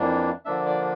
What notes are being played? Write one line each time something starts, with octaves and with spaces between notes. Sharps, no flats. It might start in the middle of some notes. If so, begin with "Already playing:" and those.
Already playing: F2 E3 A#3 D4
D3 F3 A#3 D4 E5
D5